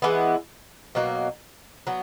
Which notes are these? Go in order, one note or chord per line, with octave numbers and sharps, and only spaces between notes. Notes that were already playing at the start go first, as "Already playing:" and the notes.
E3 G#3 B3 E4
B2 F#3 A#3
F#3 B3